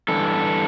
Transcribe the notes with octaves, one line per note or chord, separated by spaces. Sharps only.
G2 E3 A4